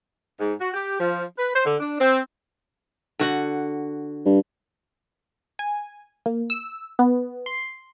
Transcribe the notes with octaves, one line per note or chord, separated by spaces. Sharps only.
G#2
F#4
G4
F3
B4
C5
D3
D4
C4
D3 F#4 F#5
G2
G#5
A#3
E6
B3
C6